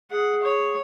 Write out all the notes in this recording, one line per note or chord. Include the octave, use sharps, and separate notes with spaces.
G#4 F#5
C#5